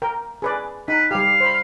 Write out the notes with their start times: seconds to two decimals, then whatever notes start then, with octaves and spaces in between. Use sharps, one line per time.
0.02 A#4 G5
0.42 G#4 B4 D5
0.88 D#4 B4
1.11 G3 G4 F5
1.40 C5 B5